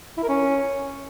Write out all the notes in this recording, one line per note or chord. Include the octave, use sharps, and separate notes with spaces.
E4
A#4
C#4